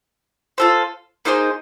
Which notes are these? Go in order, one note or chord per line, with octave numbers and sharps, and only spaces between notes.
F4 A4 C5
A#3 D#4 G#4 C5